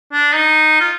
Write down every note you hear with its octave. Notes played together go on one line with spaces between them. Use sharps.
D4
D#4
F4